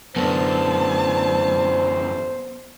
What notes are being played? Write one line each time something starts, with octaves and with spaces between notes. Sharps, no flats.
F#2 D3 B3 C5 A5